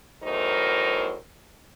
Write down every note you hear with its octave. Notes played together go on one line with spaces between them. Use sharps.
E2 A2 F#3 D#4 A#4 C5